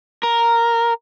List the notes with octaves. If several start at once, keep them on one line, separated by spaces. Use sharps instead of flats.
A#4